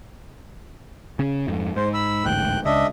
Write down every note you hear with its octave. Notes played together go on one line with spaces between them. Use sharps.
C#3 C#4
F2 G#2
G#2 C5
B5 E6
A1 D2 G#2 G5 F#6
C#2 D4 D#5 E5